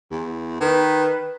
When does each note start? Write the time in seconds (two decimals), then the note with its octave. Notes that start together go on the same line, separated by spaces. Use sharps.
0.11 E2
0.60 D#3 B4